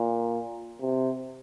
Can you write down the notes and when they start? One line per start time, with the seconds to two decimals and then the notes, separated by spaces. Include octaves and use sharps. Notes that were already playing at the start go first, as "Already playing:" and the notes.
Already playing: A#2
0.81 C3